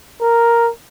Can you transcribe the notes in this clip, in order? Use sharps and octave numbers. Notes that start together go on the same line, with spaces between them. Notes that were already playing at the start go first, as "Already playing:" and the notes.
A#4